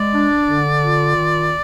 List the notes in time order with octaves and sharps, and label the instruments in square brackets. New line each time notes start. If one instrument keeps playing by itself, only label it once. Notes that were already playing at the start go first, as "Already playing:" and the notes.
Already playing: [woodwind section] G#3 [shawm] D5
[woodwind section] D4
D3
F4
D#3